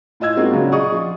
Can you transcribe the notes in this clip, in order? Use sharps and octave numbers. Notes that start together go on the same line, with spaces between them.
A2 F4 D#5 E6 G#6
G#3 A#3 C4 D#4 F4 F#4
A#2 C#3 F#3 C#4 D4
G#4 D5 D#5 C#6 D#6
F3 F4